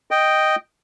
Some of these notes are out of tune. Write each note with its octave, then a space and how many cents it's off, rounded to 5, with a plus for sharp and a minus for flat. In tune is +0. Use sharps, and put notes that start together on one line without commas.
D#5 +0 G5 +0